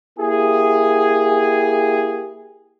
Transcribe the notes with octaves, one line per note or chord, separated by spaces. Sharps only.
A#3 E4 G4 G#4